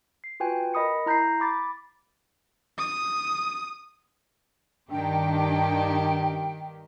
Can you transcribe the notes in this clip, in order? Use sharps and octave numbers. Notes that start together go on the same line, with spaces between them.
C7
F4 F#4 B4 G5 G#5
A#4 D#5 B5 D#6 C#7
E4 A#5 G6 B6 C7
B5 D6 A6
D#6
G2 D#3 D4 G4 G5